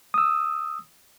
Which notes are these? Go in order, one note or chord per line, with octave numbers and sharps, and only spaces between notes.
D#6 E6